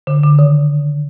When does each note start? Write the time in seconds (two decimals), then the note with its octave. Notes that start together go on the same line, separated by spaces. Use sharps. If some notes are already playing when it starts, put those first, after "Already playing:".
0.07 D3
0.23 D3
0.39 D#3